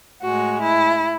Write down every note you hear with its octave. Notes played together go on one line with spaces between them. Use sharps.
A2 G#3 F#4
E4